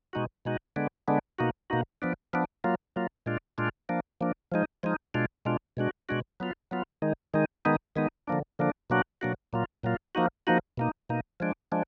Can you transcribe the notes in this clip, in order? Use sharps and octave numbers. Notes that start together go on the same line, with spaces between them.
B2 G#3 D#4 F#4
B2 G#3 D#4 F#4
D3 G#3 B3 D4
D3 G#3 B3 D4
B2 A#3 D#4 F#4
B2 A#3 D#4 F#4
F3 B3 D4
F3 B3 D4
F#3 A#3 F4
F#3 A#3 F4
A#2 G#3 D4 F4
A#2 G#3 D4 F4
F3 A#3 D4
F3 A#3 D4
F3 G#3 D#4
F3 G#3 D#4
B2 G#3 D4 F4
B2 G#3 D4 F4
B2 G#3 D4 F#4
B2 G#3 D4 F#4
F#3 B3 F4
F#3 B3 F4
D#3 G#3 D#4
D#3 G#3 D#4
D#3 G#3 B3 D#4
D#3 G#3 B3 D#4
D3 F3 A#3 D4
D3 F3 A#3 D4
B2 F#3 A#3 D4 F#4
B2 F#3 A#3 D4 F#4
A#2 F#3 A#3 F4
A#2 F#3 A#3 F4
F3 A#3 D#4 F#4
F3 A#3 D#4 F#4
B2 A#3 D#4
B2 A#3 D#4
F3 G#3 D4
F3 G#3 D4